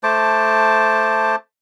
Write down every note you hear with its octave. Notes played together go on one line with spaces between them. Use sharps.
A3 C5 A5 D6